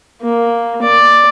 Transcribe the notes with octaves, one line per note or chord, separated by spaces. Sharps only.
A#3
D5